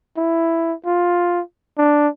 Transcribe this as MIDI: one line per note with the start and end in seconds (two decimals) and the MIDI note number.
0.17 0.74 64
0.86 1.41 65
1.78 2.08 62